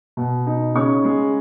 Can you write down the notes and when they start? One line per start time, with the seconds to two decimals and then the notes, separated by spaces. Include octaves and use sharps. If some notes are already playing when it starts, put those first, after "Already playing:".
0.17 B2
0.47 D#4
0.75 C#3 C#5 C#6
1.04 G#3